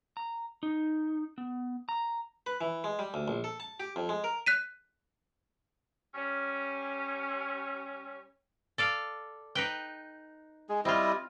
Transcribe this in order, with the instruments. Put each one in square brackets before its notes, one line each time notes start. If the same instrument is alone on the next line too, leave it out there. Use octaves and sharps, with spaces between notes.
[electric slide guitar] A#5
D#4
B3
A#5
[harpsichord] B4
E3
G#3
G3
D2
A#1
A4
A5
G4
F2
G#3
A#4
[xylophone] F#6 B6 D#7
[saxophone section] G3 C#4
[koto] A4 D5 F5
D#4 B4 G5
[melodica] G#3 G#4
[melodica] G3 E4 D#5 [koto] C4 F4